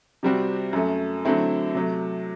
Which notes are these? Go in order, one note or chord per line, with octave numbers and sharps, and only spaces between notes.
C3 G3 C4 F#4
F#2 F#3 A3
D3 F#3 A3 C4 E4
C3 F#3 A3